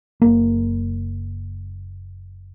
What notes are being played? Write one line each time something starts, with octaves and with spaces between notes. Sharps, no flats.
F#1 A#3